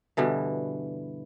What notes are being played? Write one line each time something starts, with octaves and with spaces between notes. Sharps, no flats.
G2 B2 D3 E3